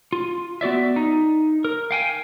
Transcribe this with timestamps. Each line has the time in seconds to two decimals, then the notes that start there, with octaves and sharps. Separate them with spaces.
0.13 F4
0.61 B3 F#4 D5 E5
0.96 D#4
1.65 A#4
1.91 F5 G5 G#5